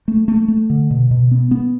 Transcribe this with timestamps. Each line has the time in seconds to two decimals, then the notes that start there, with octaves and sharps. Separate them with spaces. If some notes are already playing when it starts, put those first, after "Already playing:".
0.08 A3
0.28 A3
0.48 A3
0.70 D3
0.91 B2
1.11 B2
1.31 B3
1.51 B3